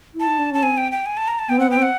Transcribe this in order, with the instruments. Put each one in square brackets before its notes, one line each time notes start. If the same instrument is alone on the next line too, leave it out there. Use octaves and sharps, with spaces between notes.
[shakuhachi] E4
[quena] A5
[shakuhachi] D#4
D4
[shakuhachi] C#4 [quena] A5
[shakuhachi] C4 [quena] G#5
[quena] G5
G5
G#5
A5
A#5
A5
[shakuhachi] B3 [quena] G5
[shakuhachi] C4 [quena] F#5
[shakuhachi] B3 [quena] G5
[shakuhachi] C4
[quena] F#5